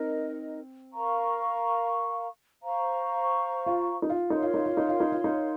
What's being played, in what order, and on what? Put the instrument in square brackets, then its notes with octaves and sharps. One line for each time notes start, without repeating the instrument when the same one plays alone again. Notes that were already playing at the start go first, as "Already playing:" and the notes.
Already playing: [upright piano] C4 [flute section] D#4 A#4 D#5
[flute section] A#4 F5 A#5 C#6
C5 F5 A#5 C#6
[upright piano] F4
D#4
F4
[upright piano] D#4 [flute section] A#4 C#5 F5 C6
[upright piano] F4
D#4
F4
D#4
F4
D#4
F4
D#4